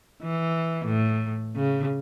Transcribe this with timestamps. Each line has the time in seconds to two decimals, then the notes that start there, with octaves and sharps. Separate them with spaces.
0.23 E3
0.85 A2
1.56 C#3